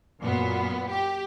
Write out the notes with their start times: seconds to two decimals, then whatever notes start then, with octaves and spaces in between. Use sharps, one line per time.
0.21 F#2 A#2 B3
0.91 G4